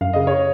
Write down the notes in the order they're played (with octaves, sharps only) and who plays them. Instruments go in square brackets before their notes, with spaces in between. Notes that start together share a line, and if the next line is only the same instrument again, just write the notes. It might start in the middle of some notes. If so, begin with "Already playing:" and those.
[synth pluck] F#2 [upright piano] F5
[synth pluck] C#3 [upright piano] D#5
[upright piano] C#5